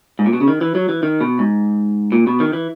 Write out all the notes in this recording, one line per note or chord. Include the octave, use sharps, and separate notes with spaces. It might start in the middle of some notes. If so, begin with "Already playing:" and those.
G#2
A#2
B2
C#3
D#3
E3
F#3
E3
D#3
B2
G#2
A#2
B2
D#3
E3